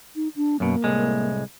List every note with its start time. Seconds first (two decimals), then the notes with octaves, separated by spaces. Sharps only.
0.16 D#4
0.36 D4
0.60 F#2 B2 A#3
0.84 C2 A2 G#3